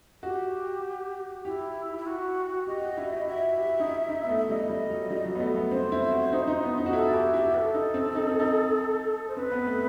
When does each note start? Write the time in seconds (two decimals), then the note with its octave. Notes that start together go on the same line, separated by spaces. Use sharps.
0.23 F#4 G4
1.45 E4 G4
1.98 E4
2.06 F#4
2.67 G4 D#5
2.82 F#4
2.98 E4
3.12 E4
3.27 F#4 E5
3.58 G4
3.80 D#4
3.88 E4
4.09 D#4
4.24 B3
4.29 A3
4.37 E5
4.49 G3 D#5
4.70 G3
4.90 F#3
5.10 G3
5.25 F#3
5.35 B3
5.40 A3
5.56 B3
5.71 C4 C5
5.92 E4
6.12 F#4
6.33 D#4
6.48 D#4
6.63 B3
6.78 D#4
6.86 F#4
6.93 E4 A4
7.14 E4 G4
7.34 E4 G4
7.54 B4
7.58 A4
7.74 D#4
7.94 C4
8.15 D#4
8.27 C4
8.40 D#4
9.28 C5
9.36 C4 B4
9.52 B3
9.66 A3